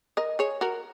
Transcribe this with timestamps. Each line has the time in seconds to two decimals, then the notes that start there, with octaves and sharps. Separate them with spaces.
0.17 A#4 D#5
0.39 G#4 C#5
0.61 F#4 A#4